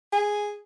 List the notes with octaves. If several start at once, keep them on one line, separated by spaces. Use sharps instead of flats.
G#4